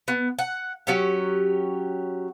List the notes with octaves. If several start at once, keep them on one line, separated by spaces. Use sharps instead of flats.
B3
F#5
F#3 C#4 G4